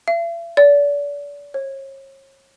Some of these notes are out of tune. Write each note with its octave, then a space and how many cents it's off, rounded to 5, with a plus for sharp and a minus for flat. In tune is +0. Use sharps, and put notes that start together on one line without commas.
E5 +45
D5 -35
C#5 -40